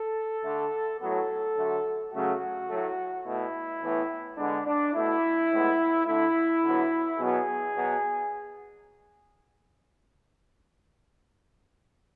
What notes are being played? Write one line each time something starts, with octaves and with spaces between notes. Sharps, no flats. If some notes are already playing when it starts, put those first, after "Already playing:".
Already playing: A4
D3 A3
A2 F#3 B3 A4
D3 F#3 A3
C#3 F#3 A3 F#4
A2 F#3 A3
B2 A3 E4
A2 E3 B3
D3 G#3 B3 D4
D4
B2 A3 E4
A2 G#3 B3
D3 A3 E4
D3 F#3 B3
B2 F#3 B3 G#4
B2 F#3 B3